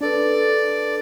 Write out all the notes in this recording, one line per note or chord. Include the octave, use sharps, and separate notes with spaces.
D4 A4 B4 D5